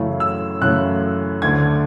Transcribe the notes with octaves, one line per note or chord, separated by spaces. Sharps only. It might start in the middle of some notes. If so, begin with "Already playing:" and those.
Already playing: F#2 C#3 E3 A3
E6
F#2 C#3 E3 A3 F#6
D2 D3 A3 G#6